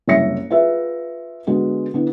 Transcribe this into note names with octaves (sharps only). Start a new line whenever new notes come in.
F#1 C2 C#5 E5 A#6 C#7
F4 G#4 B4 E5
D3 G#3 B3 F#4
D3 B3 E4